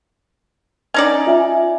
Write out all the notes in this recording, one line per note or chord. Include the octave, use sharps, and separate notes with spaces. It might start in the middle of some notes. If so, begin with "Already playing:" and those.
C#4 D#4 D5
F4 E5 G#5